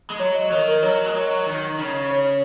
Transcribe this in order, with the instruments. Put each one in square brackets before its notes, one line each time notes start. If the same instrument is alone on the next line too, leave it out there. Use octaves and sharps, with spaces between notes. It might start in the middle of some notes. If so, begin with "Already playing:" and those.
[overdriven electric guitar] G#3
[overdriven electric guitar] F#3 [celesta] C#5
[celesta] D#5
[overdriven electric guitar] D#3 [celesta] C#5
[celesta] A#4
[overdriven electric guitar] F#3 [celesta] C#5
[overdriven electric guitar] G#3
F#3
D#3
C#3
[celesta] C#5